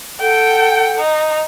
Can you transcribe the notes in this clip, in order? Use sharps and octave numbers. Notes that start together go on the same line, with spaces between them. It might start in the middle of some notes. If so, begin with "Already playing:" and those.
A4 F#5 G5
D#4